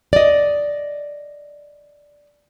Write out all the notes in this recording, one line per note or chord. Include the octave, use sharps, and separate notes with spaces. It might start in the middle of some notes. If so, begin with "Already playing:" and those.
D5 D#5